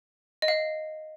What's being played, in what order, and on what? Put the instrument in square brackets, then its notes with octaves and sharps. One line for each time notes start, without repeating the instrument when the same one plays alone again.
[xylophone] D#5
F5